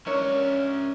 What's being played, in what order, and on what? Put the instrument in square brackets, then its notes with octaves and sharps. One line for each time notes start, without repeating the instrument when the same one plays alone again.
[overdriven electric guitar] C#4 E5 [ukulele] D4 A#4 C#5